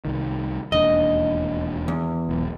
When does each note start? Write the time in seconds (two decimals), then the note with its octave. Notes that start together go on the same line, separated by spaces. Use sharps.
0.05 C2 D#3
0.72 E1 D#2 D4 D#5
1.88 E2
2.29 E1 B1